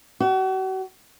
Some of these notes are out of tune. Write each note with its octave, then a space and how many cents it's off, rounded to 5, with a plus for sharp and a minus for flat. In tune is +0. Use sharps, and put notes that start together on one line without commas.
F#4 +40